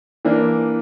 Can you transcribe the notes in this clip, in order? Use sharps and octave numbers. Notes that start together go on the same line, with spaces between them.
E3 A#3 D4